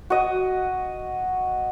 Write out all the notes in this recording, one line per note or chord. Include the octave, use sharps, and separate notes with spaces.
F#4 D#5